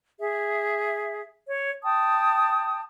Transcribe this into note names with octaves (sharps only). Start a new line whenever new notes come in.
G#4 E5
C#5
G5 A5 D#6